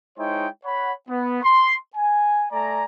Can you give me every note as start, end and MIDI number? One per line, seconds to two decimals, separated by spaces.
0.18 0.47 56
0.18 0.47 63
0.18 0.47 64
0.18 0.47 72
0.18 0.47 73
0.18 0.47 79
0.65 0.92 73
0.65 0.92 78
0.65 0.92 83
1.09 1.39 59
1.43 1.75 84
1.96 2.46 80
2.51 2.84 57
2.51 2.84 74
2.51 2.84 80
2.51 2.84 82